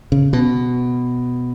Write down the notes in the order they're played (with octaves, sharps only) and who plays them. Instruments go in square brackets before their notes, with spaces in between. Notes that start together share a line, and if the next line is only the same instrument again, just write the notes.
[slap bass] C#3
B2